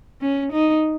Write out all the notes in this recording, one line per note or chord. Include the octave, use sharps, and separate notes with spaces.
C#4
D#4